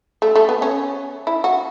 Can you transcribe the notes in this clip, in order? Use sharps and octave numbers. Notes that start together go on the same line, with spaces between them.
A3
A3
B3
C#4
E4
F#4